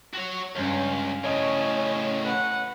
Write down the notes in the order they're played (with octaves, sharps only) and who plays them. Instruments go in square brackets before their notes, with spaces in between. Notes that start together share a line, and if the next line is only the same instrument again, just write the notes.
[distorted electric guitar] F#4 C#5
[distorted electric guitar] C#2 [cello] G2 F5 [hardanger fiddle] C#4
[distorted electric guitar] A2 C#3 [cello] C#4 [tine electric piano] C#5 D#5 [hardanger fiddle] G#5
[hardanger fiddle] B4 F#5